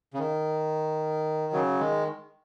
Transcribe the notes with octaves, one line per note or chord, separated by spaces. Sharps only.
C#3
D#3
C#3 F#3
D#3 G#3